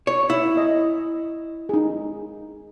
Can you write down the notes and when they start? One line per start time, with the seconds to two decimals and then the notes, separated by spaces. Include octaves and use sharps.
0.07 C#5
0.30 E4
0.57 D#5
1.69 D#4 G#4